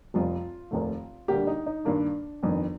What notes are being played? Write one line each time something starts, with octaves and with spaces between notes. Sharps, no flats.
F1 F2 C3 F4
F1 D#2 D#3 A3
D2 D3 G3 A#3 G4
D#4
D#4
G2 D#3 A#3 D4
G1 F2 D#3